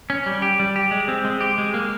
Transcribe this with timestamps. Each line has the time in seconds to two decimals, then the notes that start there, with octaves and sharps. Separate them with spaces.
0.10 C#4
0.26 G3
0.42 G4
0.59 G3
0.76 G4
0.91 G#3
1.08 C4
1.25 G#3
1.41 G4
1.58 G#3
1.74 A#3